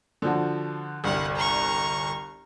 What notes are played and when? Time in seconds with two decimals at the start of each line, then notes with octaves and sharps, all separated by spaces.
0.22 D3 F3 F#4
1.04 G1 C2 F#5
1.35 A#5 C#6